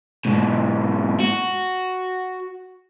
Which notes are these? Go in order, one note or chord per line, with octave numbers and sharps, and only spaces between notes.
G#2 B2
F#4